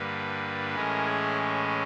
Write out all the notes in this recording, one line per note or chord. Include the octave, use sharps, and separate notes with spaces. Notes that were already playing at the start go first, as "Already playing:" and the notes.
Already playing: G2 D3 G3 A#3 B4
A2 E3 G#3 C#4 A#4
G#4